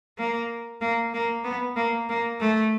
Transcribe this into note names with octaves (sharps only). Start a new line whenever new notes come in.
A#3
A#3
A#3
B3
A#3
A#3
A3